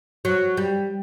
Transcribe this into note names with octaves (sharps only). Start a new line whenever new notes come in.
F#3
G3